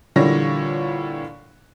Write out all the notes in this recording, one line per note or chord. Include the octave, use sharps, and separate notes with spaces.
A#2 D3 E3 G3 C#5 A#6